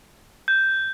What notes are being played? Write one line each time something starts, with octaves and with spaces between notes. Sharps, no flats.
G6